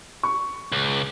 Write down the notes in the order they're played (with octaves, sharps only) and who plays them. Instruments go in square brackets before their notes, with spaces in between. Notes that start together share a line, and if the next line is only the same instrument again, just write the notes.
[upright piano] C#6
[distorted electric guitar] C#2